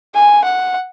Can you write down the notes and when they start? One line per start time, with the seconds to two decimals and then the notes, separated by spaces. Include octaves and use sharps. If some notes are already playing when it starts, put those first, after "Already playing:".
0.14 G#5
0.44 F#5